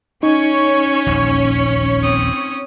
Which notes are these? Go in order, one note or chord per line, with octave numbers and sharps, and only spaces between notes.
C#4 D#4 C#5 G#5 C#6
D#1 A#1 E2
C4 D#6